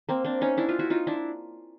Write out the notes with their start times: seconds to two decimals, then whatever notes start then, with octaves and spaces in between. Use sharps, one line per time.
0.09 A#3 C4
0.24 C4 D4
0.41 C#4 D#4
0.57 D4 E4
0.68 D#4 F4
0.79 E4 F#4
0.90 D#4 F4
1.07 D4 E4